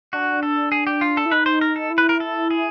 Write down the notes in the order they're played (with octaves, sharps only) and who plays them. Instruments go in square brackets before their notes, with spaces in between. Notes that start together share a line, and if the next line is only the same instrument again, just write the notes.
[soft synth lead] D4 [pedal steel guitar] F#4
[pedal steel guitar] A4
G#4
G4
F4
A4
[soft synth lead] E4
[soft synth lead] D#4 [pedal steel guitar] B4
[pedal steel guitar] C5
A#4
A4
[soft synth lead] E4
[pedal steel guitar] B4
A#4
A4
G#4